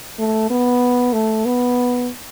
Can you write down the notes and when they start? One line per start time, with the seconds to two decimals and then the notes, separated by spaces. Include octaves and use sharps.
0.19 A3
0.50 B3
1.13 A3
1.45 B3